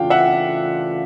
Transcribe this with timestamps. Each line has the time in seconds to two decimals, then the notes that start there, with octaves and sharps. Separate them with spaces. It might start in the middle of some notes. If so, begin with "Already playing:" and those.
Already playing: C#3 E3 A3 D4 F4 F5 G5
0.10 E5 F#5